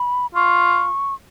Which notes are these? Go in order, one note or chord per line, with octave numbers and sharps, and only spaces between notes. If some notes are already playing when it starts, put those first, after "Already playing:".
Already playing: B5
F4 C#6